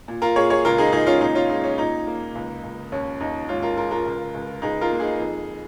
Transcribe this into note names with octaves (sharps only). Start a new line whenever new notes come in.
A#2
F4 A#4
A#2 G#4 C#5
G#4 C#5
C#2 F4 A#4
D#4 G#4
C#2 D#4 G#4
C#4 F4
A#2 D#4
C#4 F4
G#3 D#4
C#4
A#2 D#4
A#3
C#2
C#2
D#2 C#4
D#2 D#4
G#2 C#4 F4
F4 A#4
G#3 F4 A#4
F4 A#4
C#2
C#2
C#2 D#4 G#4
F4 A#4
A#3
D#4 G#4
F2